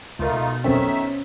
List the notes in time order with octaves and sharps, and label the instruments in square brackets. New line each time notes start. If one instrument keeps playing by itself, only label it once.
[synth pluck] C#2 A#4 [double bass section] B2 B3 [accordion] A3 D#4 F4
[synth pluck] B1 F2 C4 [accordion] D#3 E5 [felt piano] C#4 A4 C5